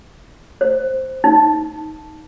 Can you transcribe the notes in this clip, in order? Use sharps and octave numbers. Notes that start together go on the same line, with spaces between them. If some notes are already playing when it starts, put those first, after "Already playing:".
C5
D#4